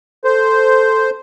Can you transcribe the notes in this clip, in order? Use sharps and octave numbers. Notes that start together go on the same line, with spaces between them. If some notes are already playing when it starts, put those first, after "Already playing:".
A4 C5